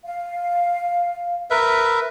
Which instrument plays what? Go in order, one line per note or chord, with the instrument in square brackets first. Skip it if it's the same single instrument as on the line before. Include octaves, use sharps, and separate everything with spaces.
[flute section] F5
[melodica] A#4 B4 E5